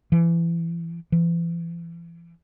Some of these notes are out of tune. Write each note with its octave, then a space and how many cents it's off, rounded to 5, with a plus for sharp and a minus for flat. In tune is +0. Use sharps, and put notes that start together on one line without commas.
E3 +30
E3 +40